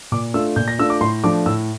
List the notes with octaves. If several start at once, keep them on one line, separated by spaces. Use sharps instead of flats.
A#2 D6
A3 D4 F4 E6
A#2 G6
A#6
A3 D4 F4 E6
D6
A2 C6
F3 A3 D4 F4 D6
A2 E6